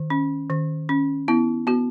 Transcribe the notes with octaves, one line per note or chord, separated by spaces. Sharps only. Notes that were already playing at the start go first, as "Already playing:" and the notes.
Already playing: D#3
C#4
D#3
C#4
B3 E4
B3 F#4